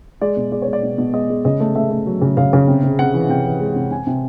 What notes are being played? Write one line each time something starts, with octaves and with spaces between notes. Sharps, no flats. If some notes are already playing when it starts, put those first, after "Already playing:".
G#3 D5
B2
G#3 D5
C#5
G#3
D5
B2
B2
G#3 D#5
G#3
C#3 D#5
A3
A3 E5
A3
F#3
C#3
C#3 F5
C#3
C3
C3
C3 F#5
E3
C3 G5
E3
G#3
C3
C3 G#5
C3